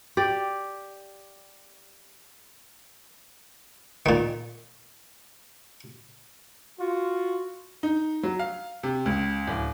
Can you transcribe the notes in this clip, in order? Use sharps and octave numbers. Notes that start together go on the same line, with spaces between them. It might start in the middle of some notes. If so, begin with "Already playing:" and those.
G4 D5
A#2 D#3
F4 F#4
D#4
F#3
F5
C3
C#2
D1